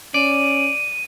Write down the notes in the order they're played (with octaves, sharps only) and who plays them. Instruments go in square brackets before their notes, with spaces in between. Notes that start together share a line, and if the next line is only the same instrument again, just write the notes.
[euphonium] C#4 [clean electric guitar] D5 [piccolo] D#7